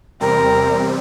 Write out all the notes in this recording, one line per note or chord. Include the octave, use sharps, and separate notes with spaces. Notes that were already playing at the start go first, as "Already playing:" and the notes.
E2 C3 G3 C4 A#4